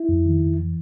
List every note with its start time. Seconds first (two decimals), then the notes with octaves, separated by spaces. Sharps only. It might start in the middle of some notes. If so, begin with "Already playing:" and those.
Already playing: E4
0.09 F2
0.26 D#3
0.43 F2
0.59 E3